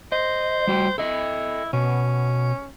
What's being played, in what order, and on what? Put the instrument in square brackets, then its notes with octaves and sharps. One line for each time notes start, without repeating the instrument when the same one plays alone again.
[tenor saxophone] C5 [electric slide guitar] D#5
[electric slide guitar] G3 F#4 G5
[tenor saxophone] E4 [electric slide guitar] A4 D#5
[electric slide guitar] B2 [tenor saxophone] C#4